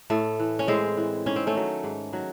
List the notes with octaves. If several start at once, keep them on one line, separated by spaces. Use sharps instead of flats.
A2 A3
E3
C#4
A2 G#3 C4
E3
G#2 C#4
C4
A3 C#4
D#3 F#3
G#2
D#3 F#3